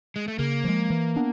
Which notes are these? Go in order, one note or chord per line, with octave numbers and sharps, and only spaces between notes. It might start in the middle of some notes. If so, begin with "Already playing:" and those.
G#3
A3
C#3 A#3
F3 G#3
E3
B3 D4